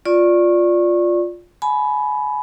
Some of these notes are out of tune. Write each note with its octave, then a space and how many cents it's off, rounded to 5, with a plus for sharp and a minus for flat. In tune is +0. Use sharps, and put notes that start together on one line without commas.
F4 +5 D5 +0 C#6 -25
G#5 +30 B5 +0